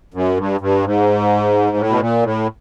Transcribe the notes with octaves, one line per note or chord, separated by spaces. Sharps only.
F#2
G2
G2
G#2
A2
B2
A#2
A2